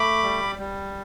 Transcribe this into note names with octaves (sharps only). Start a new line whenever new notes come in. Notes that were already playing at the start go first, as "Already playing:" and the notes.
Already playing: A3 B5 D6
G3
G3